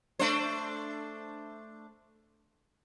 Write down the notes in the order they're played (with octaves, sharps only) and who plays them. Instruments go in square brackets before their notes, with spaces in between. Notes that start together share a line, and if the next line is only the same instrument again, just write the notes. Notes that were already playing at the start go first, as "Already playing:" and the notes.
[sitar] A3 D4 C5